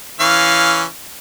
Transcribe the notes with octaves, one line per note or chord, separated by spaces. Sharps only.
E3 C#4 F5